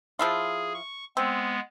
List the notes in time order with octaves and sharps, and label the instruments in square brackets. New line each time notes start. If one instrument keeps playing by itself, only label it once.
[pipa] F3 E4 F4 [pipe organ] G#4
[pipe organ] C#6
[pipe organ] G#3 B3 [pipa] C4